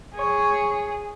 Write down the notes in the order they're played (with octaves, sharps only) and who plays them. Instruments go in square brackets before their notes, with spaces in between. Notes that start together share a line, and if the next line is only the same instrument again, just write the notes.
[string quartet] G#4 [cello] C#5